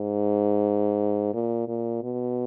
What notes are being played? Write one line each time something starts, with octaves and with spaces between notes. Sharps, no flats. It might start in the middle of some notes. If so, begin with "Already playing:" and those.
Already playing: G#2
A#2
A#2
B2